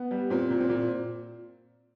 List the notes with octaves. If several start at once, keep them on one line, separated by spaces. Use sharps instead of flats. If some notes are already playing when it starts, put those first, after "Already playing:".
Already playing: B3
G3
A#2 C4
A#2
C4
A#2